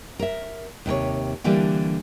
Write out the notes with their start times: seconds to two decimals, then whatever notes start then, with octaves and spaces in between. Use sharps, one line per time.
0.19 A#4 E5
0.86 D#2 C3 A#4 C#5
1.44 D3 E3 G3 A#3 D4